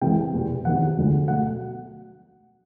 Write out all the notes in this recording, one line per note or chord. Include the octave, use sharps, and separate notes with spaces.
C2 C3 E3 G#3 G5
E2 B2 G3
E2 C3 D#3 F#3 F#5
D2 D3 F3 G#3
B2 F#3 A3 F#5